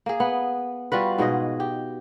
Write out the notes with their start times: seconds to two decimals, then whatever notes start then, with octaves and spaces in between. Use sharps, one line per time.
0.06 A#3 G#4
0.20 B3
0.92 G3 F4 F#4 B4
1.18 G#2 B2 G#4 D#5
1.60 G4